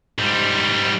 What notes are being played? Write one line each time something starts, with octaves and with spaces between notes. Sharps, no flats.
G#2 G3